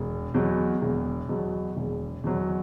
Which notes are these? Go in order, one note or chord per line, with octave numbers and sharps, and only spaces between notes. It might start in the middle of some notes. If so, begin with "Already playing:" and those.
Already playing: E1
E2 B2 F#3
E1
E2 B2 F#3
E1
E2 B2 F#3